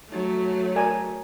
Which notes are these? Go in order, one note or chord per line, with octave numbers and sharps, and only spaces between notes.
F#3 A3
A#4 D5 G#5